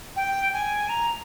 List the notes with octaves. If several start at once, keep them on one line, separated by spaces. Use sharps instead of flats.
G5
G#5
A#5